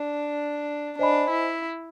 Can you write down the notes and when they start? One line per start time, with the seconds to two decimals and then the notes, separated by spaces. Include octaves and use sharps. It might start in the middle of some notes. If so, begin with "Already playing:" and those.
Already playing: D4
0.99 D4 C5 D#5 G#5 B5
1.31 E4